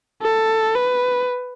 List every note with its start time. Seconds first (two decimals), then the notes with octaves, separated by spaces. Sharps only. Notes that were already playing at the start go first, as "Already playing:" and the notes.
0.22 A4
0.75 B4